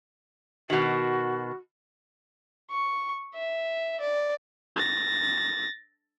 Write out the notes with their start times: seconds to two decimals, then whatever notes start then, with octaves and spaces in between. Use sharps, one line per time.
0.70 B2 D#3 F#4
2.71 C#6
3.34 E5
4.00 D5
4.76 A6 A#6